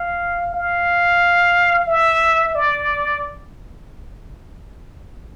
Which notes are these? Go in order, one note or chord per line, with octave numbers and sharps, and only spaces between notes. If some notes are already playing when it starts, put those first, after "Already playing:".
Already playing: F5
F5
E5
D5